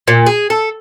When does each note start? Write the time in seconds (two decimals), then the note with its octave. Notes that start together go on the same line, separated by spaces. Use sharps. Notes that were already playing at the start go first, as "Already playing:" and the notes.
0.08 A#2
0.26 G#4
0.50 A4